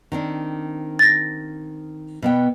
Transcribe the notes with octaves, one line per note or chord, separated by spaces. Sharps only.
D#3 C4 D4
A6 A#6
B2 B3 G5